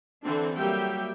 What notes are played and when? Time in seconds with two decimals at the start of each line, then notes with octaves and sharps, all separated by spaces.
0.24 D3 E3 C4 D4
0.57 F#3 G3 A#3 G4 E5 G5